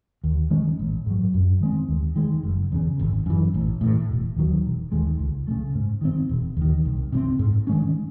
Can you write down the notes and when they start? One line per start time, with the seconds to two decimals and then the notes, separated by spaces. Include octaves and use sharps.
0.24 D#2
0.50 D#3 G#3 C#4
0.79 A1
1.06 G#2 F#3
1.34 F#2
1.61 D#3 G#3 C4
1.88 D#2
2.16 D#3 G#3
2.43 F#1
2.72 E2 C#3
3.00 G#1
3.26 F#2 E3
3.54 A1
3.81 A2 E3
4.09 E1
4.36 D#2 D#3 F#3
4.64 E1
4.92 D#2 D#3 G#3
5.19 C#2
5.47 E3 A3
5.51 C#3
5.75 G#2
6.01 D#3 F#3 C4
6.29 E1
6.57 D#2 D#3
6.85 C2
7.12 C3 E3 C4
7.39 G#2
7.67 D#3 G#3 C#4